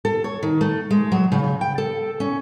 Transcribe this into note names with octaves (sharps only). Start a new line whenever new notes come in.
A4
C#5
D#3
A3
G#3
F#3
C#3
G5
A4
C#4